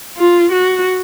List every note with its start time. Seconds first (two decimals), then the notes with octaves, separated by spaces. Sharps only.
0.17 F4
0.52 F#4